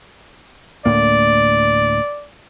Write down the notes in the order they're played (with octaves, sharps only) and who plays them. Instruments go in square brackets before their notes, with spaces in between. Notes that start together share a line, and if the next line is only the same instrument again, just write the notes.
[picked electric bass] D2 A2 A#3 [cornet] D5